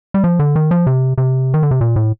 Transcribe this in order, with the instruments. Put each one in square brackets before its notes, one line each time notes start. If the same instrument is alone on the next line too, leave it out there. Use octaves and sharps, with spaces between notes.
[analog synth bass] G3
F3
D3
D#3
F3
C3
C3
D#3
D3
C3
A#2
A2